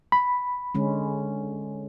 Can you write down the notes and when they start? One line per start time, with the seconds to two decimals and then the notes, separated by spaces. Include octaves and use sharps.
0.12 B5
0.75 D3 G#3 C#4